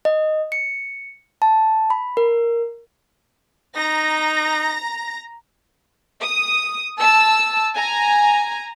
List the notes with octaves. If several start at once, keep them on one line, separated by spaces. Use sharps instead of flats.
D#5
C#7
A5
B5
A#4
D#4 A#5 A#6
D#6
A5 E6
G#5 A#5